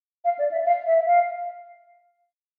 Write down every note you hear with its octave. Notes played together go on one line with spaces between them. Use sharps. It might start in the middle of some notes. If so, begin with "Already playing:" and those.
F5
D5
E5
F5
E5
F5